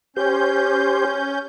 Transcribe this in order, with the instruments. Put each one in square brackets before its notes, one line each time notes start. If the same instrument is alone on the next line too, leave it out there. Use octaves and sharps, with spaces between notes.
[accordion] C#4 G6 [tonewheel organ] G4 C5